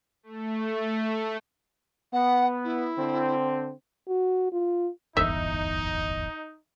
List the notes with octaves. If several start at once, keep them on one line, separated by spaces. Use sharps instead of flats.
A3
B3 F#5
E4
D3 C4
F#4
F4
D1 G1 E2 D#4 E5